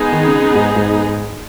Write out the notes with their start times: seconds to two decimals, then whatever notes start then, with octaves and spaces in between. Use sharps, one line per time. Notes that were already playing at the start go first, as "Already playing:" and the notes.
Already playing: G#3 B3 D#4 G#4
0.12 D#3
0.26 C#3
0.40 C#3
0.55 G#2
0.76 G#2